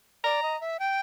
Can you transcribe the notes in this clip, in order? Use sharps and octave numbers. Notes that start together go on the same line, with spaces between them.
D5 A#5
D#5
E5
G5